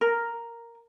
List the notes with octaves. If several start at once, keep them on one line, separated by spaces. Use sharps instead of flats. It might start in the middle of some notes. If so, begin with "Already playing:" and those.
A#4